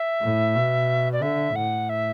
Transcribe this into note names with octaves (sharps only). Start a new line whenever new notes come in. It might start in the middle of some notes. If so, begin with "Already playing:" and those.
Already playing: E5
A2
B2
D5
D3 E5
A2 F#5
E5